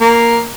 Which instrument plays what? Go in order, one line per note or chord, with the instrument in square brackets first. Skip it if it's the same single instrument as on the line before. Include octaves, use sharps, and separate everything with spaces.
[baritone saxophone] A#3